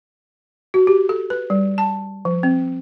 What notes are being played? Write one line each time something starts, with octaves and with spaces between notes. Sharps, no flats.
F#4
G4
A4
B4
G3
A5
F3
C4